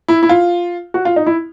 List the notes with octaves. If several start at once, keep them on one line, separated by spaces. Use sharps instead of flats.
E4
E4
F4
F#4
F4
D#4
E4